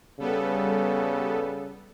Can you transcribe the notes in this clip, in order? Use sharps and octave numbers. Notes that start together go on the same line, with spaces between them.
C#3 G3 B3 A4